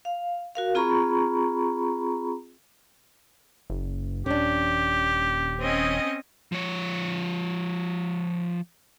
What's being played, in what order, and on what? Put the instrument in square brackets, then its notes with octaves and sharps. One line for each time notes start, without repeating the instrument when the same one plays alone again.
[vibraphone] F5
F#4 A#4 F5
C4 F4 G#4 A#5 B5 C#6
[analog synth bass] F#1
[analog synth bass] D#1 [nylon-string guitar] C#4 D4 [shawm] G4
[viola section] C4 C#4 D#5
[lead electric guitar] F3 C#5